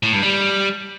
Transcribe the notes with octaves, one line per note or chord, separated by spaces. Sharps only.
A2
G2
G3